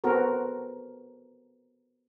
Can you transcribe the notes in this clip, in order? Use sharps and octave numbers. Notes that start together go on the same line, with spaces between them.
B3 C4 F#4 A4 A#4